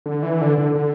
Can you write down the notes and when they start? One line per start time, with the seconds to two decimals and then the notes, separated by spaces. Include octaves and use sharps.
0.06 D3
0.23 E3
0.41 D3
0.58 D3
0.75 D3